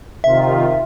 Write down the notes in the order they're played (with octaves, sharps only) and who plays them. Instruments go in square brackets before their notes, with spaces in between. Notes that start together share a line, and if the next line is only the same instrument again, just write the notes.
[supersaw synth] C3 D#3 F4 [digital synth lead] E5